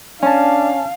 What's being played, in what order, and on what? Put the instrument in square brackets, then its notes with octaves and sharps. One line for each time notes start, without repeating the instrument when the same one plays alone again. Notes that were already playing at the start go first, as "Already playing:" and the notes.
[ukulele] C#4 [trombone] D4 [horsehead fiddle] F5 [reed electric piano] G#5 A5